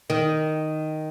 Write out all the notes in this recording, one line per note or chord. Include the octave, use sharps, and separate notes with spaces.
D#3